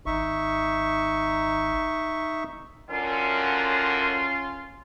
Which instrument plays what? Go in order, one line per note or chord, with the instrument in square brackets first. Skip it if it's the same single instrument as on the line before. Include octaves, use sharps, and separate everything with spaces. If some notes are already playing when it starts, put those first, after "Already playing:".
[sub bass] G#1 [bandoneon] D#4 E5 C#6
[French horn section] F#2 D3 A#4 [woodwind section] C#4 F4